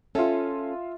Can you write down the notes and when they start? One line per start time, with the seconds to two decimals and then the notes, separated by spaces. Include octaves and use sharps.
0.15 C#4 F4 A4 E5